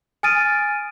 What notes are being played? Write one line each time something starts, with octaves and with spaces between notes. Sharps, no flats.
G#5 D#6 F6 A6 D7 D#7